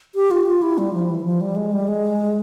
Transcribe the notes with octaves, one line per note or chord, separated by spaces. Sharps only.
G4
F4
F4
E4
G3
F3
E3
F3
G3
G#3
G3
G#3